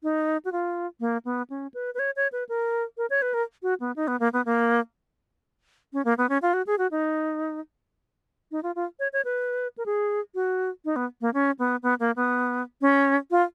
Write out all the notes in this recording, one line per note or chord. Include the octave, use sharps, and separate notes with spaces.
D#4
F#4
F4
A#3
B3
C#4
B4
B4
C#5
C#5
B4
A#4
A#4
C#5
B4
A#4
F#4
B3
D#4
B3
A#3
B3
A#3
C#4
A#3
B3
C#4
F4
F#4
G#4
F#4
D#4
D#4
F4
F4
C#5
C#5
B4
A#4
G#4
F#4
D#4
B3
A#3
C#4
B3
B3
A#3
B3
C#4
F4